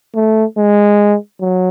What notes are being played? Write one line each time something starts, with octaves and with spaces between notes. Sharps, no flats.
A3
G#3
F#3